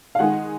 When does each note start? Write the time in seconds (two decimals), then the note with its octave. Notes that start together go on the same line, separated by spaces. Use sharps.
0.15 F5
0.19 D#3 G#3 D#4 G#4 F#5